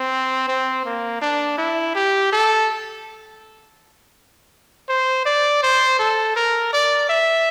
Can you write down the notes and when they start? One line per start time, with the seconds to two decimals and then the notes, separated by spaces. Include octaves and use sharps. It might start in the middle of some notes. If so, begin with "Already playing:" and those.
Already playing: C4
0.48 C4
0.86 A#3
1.21 D4
1.58 E4
1.95 G4
2.32 A4
4.89 C5
5.26 D5
5.63 C5
5.99 A4
6.36 A#4
6.73 D5
7.10 E5